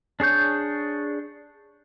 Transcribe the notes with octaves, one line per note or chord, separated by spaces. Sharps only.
D4 G#4 C#5 G6